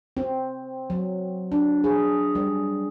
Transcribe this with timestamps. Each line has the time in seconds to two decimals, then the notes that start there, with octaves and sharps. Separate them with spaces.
0.17 C4
0.90 F#3
1.52 D4
1.84 G#4
2.35 G3